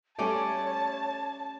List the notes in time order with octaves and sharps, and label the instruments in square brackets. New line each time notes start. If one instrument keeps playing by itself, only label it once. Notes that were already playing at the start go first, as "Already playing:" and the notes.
[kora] G3 C#4 D5 [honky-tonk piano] A3 [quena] C#5 [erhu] A5